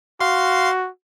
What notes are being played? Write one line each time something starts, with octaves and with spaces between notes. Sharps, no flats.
F#4 F5 C6